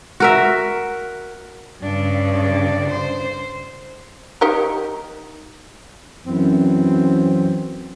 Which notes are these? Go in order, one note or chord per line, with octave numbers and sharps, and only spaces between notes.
F#4 A#4 E5
G2 C#3 D4
C5
D#4 G4 A#4
F#2 E3 C4